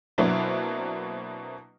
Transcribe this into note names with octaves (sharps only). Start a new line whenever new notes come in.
B2 F#3 A#3 C4 D4 E4